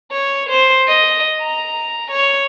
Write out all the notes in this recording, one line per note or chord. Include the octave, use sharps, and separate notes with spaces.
C#5
C5
D#5
A#5
C#5